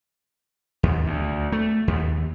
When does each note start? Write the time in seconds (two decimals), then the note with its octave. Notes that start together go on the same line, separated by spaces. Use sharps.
0.83 D#2
1.06 D2
1.52 A3
1.88 D#2